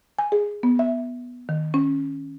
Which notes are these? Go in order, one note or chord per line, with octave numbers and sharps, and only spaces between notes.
G#5
G#4
B3
E5
D#3
C#4